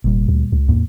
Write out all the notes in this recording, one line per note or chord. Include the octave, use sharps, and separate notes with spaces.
F1 A#2 G3
D2
C#2
E2 A2 A#3